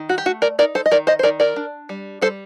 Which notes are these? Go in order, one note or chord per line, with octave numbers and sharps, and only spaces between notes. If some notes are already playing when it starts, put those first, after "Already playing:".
Already playing: D#3
F#4
G4
A3 F#4
A#4 D5
D#4 A#4 D5
A4 C5
D#5
D#3 A#4 D5
C5 D#5
C5
D#3 A#4 D5
A#4 D5
D4
G3
G3 A4 C5